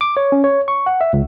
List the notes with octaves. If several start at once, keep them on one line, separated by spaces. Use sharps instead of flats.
D6
C#5
C#4
C#5
C#6
F#5
E5
C#2